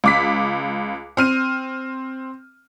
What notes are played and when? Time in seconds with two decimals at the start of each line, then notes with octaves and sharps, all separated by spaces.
0.04 C#2 D6 B6
1.17 C4 F6 D#7